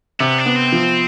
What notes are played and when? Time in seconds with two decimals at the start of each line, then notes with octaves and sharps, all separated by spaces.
0.20 C3 B3
0.38 D4
0.46 B3
0.56 C4
0.72 F3